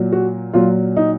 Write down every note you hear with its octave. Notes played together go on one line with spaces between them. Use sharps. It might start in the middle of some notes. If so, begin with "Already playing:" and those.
Already playing: A#2 F#3
F#4
A#2 F#3 F4
D#4